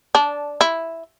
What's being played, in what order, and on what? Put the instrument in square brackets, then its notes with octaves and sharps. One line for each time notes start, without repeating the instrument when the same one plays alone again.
[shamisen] D4
E4